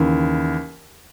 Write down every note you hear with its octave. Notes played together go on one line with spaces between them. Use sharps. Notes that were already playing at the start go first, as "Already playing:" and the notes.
Already playing: D#2 C#3 E3